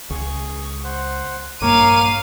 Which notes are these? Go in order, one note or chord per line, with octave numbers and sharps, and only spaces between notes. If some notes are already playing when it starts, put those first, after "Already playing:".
C#2 G#4 C#6
C5 F#5
A#1 G2 A#3 A#4 C#5 F5 D6 D#7